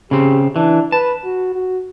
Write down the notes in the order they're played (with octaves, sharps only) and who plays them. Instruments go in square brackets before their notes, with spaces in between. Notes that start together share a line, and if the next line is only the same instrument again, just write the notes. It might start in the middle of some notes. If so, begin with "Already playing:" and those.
[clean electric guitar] C#3 C4 [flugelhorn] G4
[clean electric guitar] E3 [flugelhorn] D4
[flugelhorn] B4 [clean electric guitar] A5
[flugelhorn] F#4
F#4